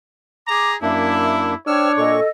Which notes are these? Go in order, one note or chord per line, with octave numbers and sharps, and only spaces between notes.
G#4 A#5 D6
F#2 A#3 D4 E4 E5
D4 C5 C#5 G5 E6 F6
A#2 A4 D#5 C#6